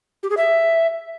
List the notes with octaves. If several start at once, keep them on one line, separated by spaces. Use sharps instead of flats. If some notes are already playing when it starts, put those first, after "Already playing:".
G4
G#4
E5